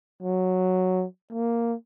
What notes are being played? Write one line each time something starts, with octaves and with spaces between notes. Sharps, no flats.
F#3
A#3